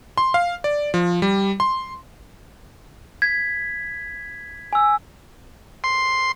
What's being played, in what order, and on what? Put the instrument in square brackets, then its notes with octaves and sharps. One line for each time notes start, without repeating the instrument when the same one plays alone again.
[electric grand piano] C6
F5
D5
F3
G3
C6
[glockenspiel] G#6 B6
G#5 E6
[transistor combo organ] C6